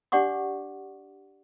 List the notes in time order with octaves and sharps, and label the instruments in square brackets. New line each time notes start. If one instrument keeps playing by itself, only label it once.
[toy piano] D4 G4 D5 F#5 C#6 D6